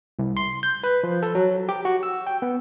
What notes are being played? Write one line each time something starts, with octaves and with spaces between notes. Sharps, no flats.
C2
C6
G6
B4
F3
A4
F#3
G4
F#4
E6
G5
B3